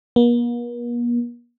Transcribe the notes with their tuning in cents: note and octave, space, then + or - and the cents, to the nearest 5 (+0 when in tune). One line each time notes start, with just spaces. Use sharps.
A#3 +45